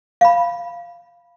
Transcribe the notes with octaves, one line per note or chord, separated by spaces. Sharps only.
F5 B5